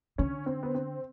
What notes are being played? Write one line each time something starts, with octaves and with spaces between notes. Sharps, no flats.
D3 C#4
C4
B3
C4